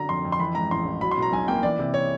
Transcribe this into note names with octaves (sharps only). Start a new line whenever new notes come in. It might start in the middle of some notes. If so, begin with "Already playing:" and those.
Already playing: D3 F#3 A#5
F2 C6
F2
C6
E3 B5
G#2 A#5
A1 C6
A1
F#3 B5
C6
B2 A#5
B1 G#5
A#3 G5
E3 D5
C3
C#5